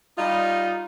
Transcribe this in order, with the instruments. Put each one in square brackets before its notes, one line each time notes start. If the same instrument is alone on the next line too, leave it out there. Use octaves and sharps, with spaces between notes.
[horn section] G3 D#4 [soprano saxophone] F4